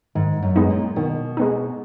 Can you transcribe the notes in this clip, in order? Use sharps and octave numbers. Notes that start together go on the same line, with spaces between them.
G#2 D#3
F#2
G#3 B3 D#4
A#2
B2 D#3
G#3 B3 D#4